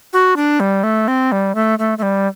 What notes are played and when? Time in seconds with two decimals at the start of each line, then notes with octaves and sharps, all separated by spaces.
0.13 F#4
0.36 D4
0.60 G3
0.83 A3
1.08 C4
1.32 G3
1.55 A3
1.79 A3
1.98 A3
2.02 G3